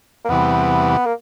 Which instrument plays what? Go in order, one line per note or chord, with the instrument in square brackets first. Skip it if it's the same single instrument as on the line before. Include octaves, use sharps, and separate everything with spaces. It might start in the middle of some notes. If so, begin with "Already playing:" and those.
[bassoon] A#3
[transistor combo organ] E2 C3 E3 G3 [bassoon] B3
[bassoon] A#3